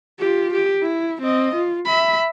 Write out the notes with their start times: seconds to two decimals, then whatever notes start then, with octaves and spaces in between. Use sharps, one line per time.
0.19 F4 G4
0.53 G4
0.82 E4
1.21 C4 D#5
1.55 F4
1.85 E5 B5